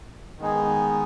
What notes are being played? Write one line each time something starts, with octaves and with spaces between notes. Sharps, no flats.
D#3 G#3 B3 D#4 G#4